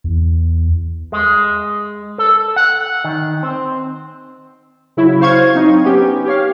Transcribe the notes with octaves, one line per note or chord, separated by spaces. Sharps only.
E2
G#3
A4
F#5
D#3
C4
C#3 F#3 E4 F#4
C5 F5 C#6 G#6
F#3 C4 D#4
B3 C#4 G4
G4 C#5 F5